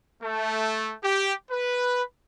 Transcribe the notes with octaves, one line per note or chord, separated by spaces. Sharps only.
A3
G4
B4